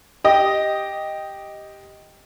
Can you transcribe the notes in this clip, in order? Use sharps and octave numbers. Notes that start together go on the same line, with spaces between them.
G4 D#5